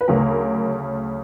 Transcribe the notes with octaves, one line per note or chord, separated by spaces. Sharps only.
B4
D2 C#3 F#3 A#4